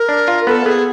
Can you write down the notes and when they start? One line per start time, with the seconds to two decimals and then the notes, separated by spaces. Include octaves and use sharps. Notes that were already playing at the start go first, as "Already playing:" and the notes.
Already playing: A#4
0.09 D4
0.28 F4
0.47 B3 A4
0.66 B3 G#4